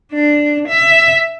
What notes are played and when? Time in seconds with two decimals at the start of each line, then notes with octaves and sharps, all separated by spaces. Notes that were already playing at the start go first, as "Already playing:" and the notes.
0.13 D4
0.68 E5